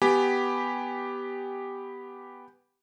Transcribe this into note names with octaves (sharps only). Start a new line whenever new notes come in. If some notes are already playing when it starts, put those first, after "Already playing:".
B3 G4 G5 G#5 B5